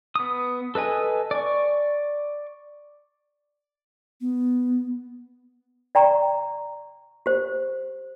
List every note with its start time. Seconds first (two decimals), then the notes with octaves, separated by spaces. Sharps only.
0.16 B3 D#6
0.75 A4 B4 D#5 G#5
1.31 D5 C#6
4.21 B3
5.95 D5 G5 A#5 C#6
7.26 G4 C5